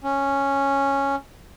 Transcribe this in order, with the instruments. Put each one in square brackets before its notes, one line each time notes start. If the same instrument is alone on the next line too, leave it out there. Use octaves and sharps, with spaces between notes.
[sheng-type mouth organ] C#4